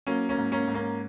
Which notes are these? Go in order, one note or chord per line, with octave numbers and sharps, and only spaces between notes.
F#3 A#3 C#4
A#3 C#4
G#2
A#3 C#4
G#2
A#3 C#4